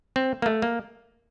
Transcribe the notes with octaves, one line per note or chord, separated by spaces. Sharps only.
C4
A#3
A3
A#3